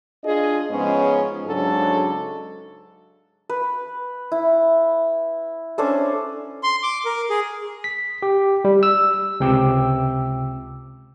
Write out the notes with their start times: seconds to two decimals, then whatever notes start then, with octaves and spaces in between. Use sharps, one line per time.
0.24 D4 F4 G#4 D#5
0.71 G#2 F3 G#3 B3 C#4
1.46 G#2 C#3 F#3 D4 F#4 A4
3.49 B4
4.32 E4
5.78 C#4 D4 A4 C5
6.63 C6
6.83 D6
7.05 A#4
7.30 G#4
7.84 B6
8.23 G4
8.65 G3
8.83 E6
9.40 C#2 C3 G5 D6 E6